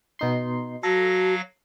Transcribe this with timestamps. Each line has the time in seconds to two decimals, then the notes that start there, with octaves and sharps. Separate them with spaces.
0.19 B2 D#4 C6
0.83 F#3 F#4 A4 F5 A#6